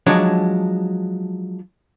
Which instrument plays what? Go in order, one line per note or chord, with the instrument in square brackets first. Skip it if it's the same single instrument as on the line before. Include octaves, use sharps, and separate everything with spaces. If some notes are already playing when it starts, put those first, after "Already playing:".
[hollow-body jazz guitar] F3 F#3 G#3 D4 C#5